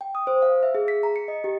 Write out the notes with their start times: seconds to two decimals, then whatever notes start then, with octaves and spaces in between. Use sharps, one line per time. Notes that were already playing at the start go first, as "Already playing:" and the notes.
0.01 G5
0.15 D#6
0.27 C5
0.42 F5
0.63 E5
0.75 G#4
0.88 B6
1.03 A#5
1.16 C#7
1.28 D#5
1.44 G4